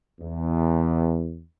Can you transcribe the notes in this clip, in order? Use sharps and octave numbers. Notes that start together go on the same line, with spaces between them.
E2